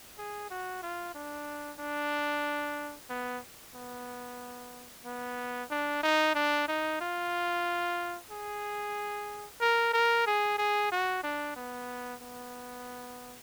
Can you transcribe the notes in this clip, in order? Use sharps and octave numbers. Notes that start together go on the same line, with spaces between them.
G#4
F#4
F4
D4
D4
B3
B3
B3
D4
D#4
D4
D#4
F4
G#4
A#4
A#4
G#4
G#4
F#4
D4
B3
B3